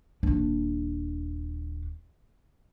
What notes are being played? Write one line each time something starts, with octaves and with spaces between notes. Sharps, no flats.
D#1 D4